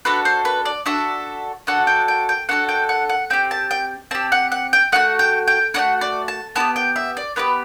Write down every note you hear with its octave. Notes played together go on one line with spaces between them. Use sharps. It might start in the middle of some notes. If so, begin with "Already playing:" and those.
D4 F#4 A4 B4
C5
B4
D5
D4 F#4 A4 E5
D4 F#4 A4 F#5
G5
G5
G5
D4 F#4 A4 F#5
G5
F#5
F#5
C4 G4 G5
A5
G5
C4 G4 A5
F#5
F#5
G5
A3 D4 F#4 F#5
G5
G5
A3 D4 F#4 F#5
D5
A5
B3 E4 G4 A5
G5
E5
D5
B3 E4 G4 B4